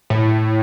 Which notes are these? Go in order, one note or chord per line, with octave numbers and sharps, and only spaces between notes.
A2